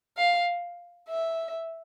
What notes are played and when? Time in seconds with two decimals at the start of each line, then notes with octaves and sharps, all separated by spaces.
0.17 F5
1.09 E5